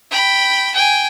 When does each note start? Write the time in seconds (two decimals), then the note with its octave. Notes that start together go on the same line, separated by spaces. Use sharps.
0.11 G5 B5
0.74 G5 G#5